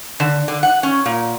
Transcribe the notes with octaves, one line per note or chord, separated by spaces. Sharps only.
D3
D3
F#5
C#4
A#2